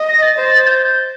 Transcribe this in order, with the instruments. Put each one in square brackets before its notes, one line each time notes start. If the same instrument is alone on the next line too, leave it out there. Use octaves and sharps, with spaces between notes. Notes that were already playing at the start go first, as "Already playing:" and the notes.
Already playing: [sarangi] D#5
[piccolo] A#6
A6
[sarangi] C5
[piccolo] G6